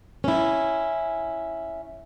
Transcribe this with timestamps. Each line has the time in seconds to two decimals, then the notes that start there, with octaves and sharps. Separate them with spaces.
0.24 C#4 E4